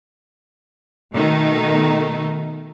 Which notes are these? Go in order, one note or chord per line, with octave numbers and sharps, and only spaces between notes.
B2 D#3 A3 D#4